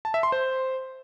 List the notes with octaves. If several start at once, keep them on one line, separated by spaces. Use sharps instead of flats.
A5
E5
C6
C5